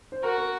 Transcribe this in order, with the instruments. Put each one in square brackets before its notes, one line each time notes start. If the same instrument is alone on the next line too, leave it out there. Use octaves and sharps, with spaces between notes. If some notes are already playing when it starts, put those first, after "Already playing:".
[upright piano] C5
[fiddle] F#4 [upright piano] A#4
[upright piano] A#4